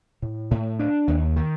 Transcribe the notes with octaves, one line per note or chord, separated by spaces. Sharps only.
A2
A2
D4
D#2
D#3